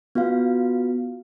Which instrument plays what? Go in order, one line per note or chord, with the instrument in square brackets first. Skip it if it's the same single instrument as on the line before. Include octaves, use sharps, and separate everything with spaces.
[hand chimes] B3 F4 F#4 F5